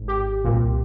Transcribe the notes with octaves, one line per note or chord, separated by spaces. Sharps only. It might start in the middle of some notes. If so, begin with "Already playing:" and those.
Already playing: G#1 G#2
G4
C2 A#2